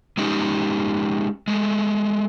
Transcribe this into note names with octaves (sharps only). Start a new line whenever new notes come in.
G#3 C#4 D#4 G4
G#3 A3